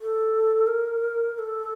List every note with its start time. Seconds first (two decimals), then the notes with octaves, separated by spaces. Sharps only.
0.01 A4
0.67 A#4
1.34 A#4
1.39 A4